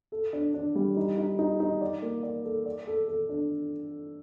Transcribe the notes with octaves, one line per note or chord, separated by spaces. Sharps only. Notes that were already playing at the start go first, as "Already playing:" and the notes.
A4
D4
D4
G3
D#4
D#4
D#4
D#4
D5
A#3
D5
A4
D5
A4
A4
D4